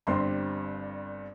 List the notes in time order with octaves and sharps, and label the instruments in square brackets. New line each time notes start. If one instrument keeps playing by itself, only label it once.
[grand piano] G1 G2 G3 C4 C6